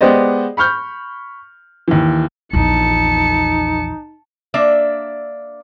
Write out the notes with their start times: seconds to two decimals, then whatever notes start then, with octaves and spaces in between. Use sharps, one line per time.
0.01 G#3 B3 G4 C5 D5 D#5
0.57 B5 C#6 F6 G6
1.88 D#2 E3
2.53 A#1 E2 D#4 A5 C#7
4.54 A#3 D4 D5 E5